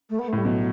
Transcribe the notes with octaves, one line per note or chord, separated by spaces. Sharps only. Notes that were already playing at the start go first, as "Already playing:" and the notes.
A3
B3
A3
A2 G3
B2 F#3